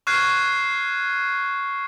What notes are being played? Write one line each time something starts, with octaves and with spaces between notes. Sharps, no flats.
C#6 F6 F#6 G#6 C7 D#7